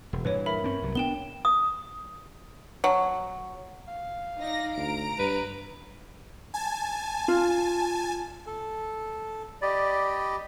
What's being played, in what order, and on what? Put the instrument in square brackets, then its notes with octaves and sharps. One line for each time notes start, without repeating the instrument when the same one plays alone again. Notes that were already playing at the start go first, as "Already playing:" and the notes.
[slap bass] E1
[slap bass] G2 A#2 E3 [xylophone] B4 C#5
[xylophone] A#4 E5 B5
[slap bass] C4 C#4
C2 F#3
[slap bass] B3 D4 [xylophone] G5 E7 G7
[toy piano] D#6
[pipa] F#3
[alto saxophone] F5
[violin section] D#4 D5 A#6
[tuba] D2 [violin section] A#5 D7
[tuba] G2 [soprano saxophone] B4
[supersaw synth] G#5 A5
[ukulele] F4
[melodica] A4
[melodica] G4 D#5 B5 [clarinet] D5